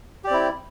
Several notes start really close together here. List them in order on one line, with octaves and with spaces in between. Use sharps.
G4 D5 C4 E4